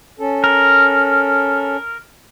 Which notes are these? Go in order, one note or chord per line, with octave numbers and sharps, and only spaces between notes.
C#4 A4
A#4